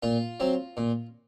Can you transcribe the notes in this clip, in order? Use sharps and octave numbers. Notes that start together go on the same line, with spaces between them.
A#2 F4
F#3 C4
A#2